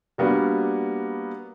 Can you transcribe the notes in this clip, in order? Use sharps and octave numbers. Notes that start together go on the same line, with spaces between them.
G3 A#3 B3 D4 F#4